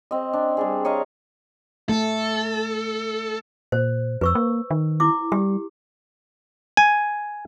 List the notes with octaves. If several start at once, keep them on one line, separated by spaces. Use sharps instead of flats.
C4 D#5
D4
G3 D4 G#4
C#5 D#5 F5 A#5
A3 A4
A#2 C5
F2 B4 C#6 E6
A#3
D#3
E4 D6
G3 G4
G#5